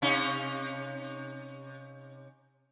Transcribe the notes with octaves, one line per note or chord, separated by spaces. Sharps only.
C3 C#4 D#4